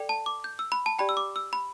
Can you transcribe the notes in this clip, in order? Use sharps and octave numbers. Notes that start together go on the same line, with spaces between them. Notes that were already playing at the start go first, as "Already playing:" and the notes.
Already playing: A4 D5 G5
A5
D6
G6
E6
B5
A5
G4 D5 G5 B5
E6
D6
E6
B5